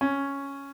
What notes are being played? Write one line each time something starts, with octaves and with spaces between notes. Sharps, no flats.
C#4